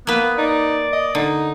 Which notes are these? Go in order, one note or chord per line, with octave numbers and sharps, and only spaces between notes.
A#3 B3 B4
D#4 D5
D#5
D3 D#4